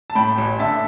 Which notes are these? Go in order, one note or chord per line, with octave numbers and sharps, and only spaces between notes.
A5
A2 G5 B5
A1
D3 E5 A5